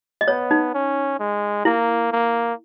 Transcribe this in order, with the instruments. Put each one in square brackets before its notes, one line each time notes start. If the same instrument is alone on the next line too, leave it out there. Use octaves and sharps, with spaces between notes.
[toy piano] D#5
[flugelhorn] B3 [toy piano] C#5
[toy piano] D#4
[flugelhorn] C#4
G#3
[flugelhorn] A#3 [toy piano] E4
[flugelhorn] A#3